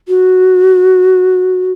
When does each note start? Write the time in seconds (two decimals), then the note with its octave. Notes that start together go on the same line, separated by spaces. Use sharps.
0.08 F#4